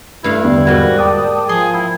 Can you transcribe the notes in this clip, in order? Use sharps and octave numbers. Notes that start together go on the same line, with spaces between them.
G2 A3 E4 F5
E2 D3 G3 B3
G#2 A#3 F#4
D5 G5 A5 D#6
F3 G#4 C6
E4